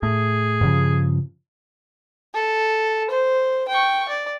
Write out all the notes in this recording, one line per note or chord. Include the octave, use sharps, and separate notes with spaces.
A2 G#4
G2 C#3 F3
A4
C5
G5 C#6
D5